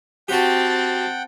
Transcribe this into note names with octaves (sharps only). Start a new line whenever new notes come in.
C4 F#4 G4 F#5 G5 A5